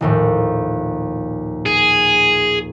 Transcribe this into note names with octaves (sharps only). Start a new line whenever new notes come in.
A#1 D#2 A2
G#4